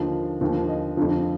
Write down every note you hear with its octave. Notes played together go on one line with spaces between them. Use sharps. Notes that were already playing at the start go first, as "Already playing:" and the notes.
Already playing: D#2 D3 F3
D#2 D3 F3
D#5
F2 D3 F3